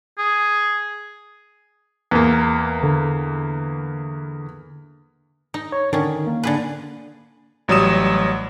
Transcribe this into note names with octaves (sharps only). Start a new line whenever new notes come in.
G#4
E2 A#3
D3
D#4
C#5
D3 D#3 C#4
A#3
D3 G#4 B4
A1 F#3 G3 D#6 E7